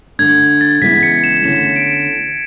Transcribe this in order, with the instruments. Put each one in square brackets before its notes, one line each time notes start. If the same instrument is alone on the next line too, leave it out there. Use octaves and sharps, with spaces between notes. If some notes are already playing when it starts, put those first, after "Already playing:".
[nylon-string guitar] D3 A3 D4 [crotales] G#6
[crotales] A6
[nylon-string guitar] C#3 E3 G#3 B3 E4 [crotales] B6
[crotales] C#7
E7
[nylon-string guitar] D3 A3 C#4 E4 [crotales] E7
[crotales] D7